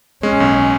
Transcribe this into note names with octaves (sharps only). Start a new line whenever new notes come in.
G#3 C#4
B1